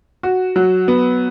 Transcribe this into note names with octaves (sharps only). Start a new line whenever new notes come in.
F#4
F#3
B3